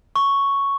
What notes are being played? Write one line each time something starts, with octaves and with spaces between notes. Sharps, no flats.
C#6